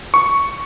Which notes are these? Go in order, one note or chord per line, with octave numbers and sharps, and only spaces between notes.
C#6